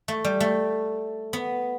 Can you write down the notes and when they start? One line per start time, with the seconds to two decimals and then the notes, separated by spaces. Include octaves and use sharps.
0.08 A3
0.24 G3
0.40 A3
1.33 B3